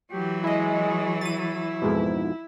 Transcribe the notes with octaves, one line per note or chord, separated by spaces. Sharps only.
E3 F#3 G4
G#3 E4 D#5
E4 A6 D#7
F2 G#2 B2